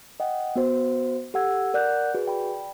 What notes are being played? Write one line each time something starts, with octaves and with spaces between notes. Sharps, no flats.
D#5 F#5 G5
B3 F#4 C5
G4 A4 F#5 E6 G#6
A#4 D5 F#5 F#6 G6
F#4 G#4 B4
D5 G5 B5